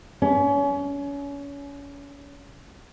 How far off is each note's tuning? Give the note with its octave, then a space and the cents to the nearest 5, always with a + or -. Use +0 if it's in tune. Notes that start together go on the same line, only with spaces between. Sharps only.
C#4 +30